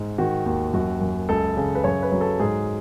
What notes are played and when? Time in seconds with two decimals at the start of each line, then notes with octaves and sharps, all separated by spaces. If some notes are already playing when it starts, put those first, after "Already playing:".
Already playing: G#2
0.18 D#3 F#4
0.46 D#2
0.73 F#2 F#4
1.01 F#2
1.29 C#2 A4
1.57 C#3
1.75 B4
1.84 F#2 C#5
2.02 B4
2.12 F#3
2.21 A4
2.39 G#2 G#4